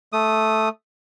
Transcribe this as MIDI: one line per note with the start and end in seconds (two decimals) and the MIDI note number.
0.13 0.69 57
0.13 0.69 87